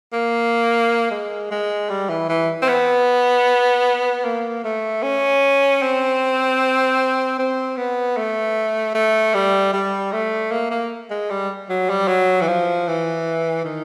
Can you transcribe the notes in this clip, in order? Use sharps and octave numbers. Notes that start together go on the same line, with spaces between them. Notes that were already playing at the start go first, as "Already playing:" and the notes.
A#3
G#3
G#3
G3
E3
E3
C4
B3
A#3
A3
C#4
C4
C4
B3
A3
A3
G3
G3
A3
A#3
A#3
G#3
G3
F#3
G3
F#3
E3
F3
E3
D#3